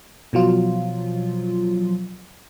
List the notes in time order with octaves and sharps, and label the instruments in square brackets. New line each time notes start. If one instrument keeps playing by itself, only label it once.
[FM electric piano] B2 F3 F#3 F4